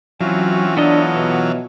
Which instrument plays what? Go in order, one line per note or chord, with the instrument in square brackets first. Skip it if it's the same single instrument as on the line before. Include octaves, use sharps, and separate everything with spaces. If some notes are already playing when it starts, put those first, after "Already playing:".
[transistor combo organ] E3 F4 [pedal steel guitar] F#3 [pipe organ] C4 C#4 F#4
[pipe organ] F#3 [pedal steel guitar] B3 A4 D#5 [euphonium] D4
[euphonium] B2